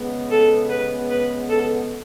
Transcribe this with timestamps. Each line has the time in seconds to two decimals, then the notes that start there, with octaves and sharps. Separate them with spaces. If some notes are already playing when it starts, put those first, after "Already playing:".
Already playing: C#3 G#3 B3
0.31 A4
0.70 B4
1.10 B4
1.49 A4